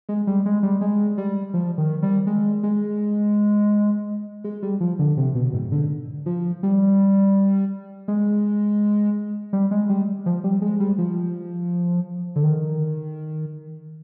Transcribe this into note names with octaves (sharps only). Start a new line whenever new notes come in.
G#3
G3
G#3
G3
G#3
G3
F3
D#3
G3
G#3
G#3
G#3
G3
F3
D3
C3
B2
G#2
D3
F3
G3
G#3
G3
G#3
G3
F3
G3
G#3
G3
F3
D3
D#3